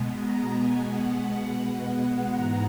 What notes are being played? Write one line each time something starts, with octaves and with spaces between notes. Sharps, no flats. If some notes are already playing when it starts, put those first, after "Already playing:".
Already playing: B2 G#3 B3
A#5
G#5
F#5
F#5
G#2 E3 G#3 B3 A#5